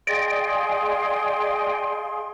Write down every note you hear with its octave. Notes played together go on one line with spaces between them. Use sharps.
G#4 D5 D#5 F5 G5 C6